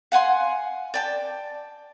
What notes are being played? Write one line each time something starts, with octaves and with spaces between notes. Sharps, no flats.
F5 F#5 G#5 C6
D5 G5 A5